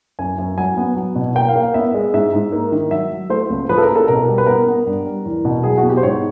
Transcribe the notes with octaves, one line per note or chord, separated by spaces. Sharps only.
F#2 G#5
F#2
F#3 G#5
B3
F#3
B2
A#3 G5
F5
A#3
F5
B3 E5
G#3
G#2 E5
G#2
A#3
D#3
F#3 E5
F#3
A3 C5
C#2
F3 B4
A4
A#4
A#3
A4
B2 A#4
G3
B4
B3 A#4
B3
G2
G3
E2
B2
F#3 G#4
F#4
B3
G4
C5
G#2 C#5